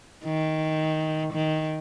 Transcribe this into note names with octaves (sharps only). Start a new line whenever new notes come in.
D#3
D#3